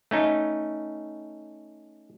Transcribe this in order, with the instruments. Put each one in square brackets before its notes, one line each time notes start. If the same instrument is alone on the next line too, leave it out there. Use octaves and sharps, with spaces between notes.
[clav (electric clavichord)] A3 C#4 D#4